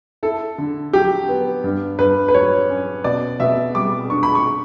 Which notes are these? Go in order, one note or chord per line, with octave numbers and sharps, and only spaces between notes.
E4 A4
D3
F#3 G4
B3
G2
G2 B4
B4
F#3 C#5
C#4
B2 D5
B2 E5
G3 D6
D4 C#6
B5
C#6